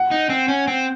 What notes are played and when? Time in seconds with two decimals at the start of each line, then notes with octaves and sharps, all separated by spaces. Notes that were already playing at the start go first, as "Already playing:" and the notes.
Already playing: F#5
0.11 D#4
0.29 C4
0.48 C#4
0.68 C4